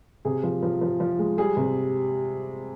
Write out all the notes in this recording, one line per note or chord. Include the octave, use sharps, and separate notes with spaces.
C3 G#4
F3
F3
F3
F3
G#3
G3 G#4
C3